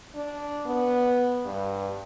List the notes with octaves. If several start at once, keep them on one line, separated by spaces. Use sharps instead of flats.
D4
B3
G2